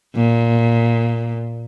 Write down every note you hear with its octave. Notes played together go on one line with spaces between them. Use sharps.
A#2